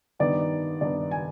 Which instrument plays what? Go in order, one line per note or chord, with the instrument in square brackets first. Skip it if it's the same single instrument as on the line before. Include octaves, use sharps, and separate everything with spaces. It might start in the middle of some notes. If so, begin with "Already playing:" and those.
[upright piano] G2 D#3 B3 D#4 D5
G2 D#3 B3 D#4 D5
G#5